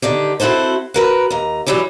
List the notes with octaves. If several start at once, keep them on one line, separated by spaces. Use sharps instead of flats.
D3 D#3 D4 G4
C4 E4 F#4 A4 C5
F#4 A#4 B4
D#2 A#5
E3 F#3 G3 E4 G4